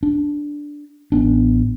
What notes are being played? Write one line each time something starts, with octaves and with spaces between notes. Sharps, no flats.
D4
A1 B3 D4